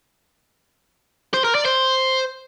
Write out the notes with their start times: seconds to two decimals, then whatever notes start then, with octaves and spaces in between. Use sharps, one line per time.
1.34 C5
1.44 A#4
1.55 D5
1.65 C5